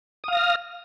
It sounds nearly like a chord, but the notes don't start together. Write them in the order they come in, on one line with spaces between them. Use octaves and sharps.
D#6 F5 A#6 F6